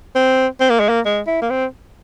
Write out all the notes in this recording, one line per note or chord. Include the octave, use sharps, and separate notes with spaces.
C4
C4
A#3
G#3
A#3
G#3
E4
A#3
C4